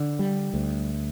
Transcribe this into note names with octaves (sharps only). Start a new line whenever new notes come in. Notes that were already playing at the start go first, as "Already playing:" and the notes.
Already playing: D3
G3
D2